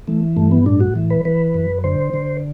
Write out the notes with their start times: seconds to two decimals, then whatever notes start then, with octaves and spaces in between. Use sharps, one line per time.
0.07 E3 A3
0.36 G2 A3
0.51 B3
0.66 A2 D4
0.80 F#4
0.96 E3
1.10 B4
1.25 E3 B4
1.54 F#2
1.84 D3 C5
2.14 D3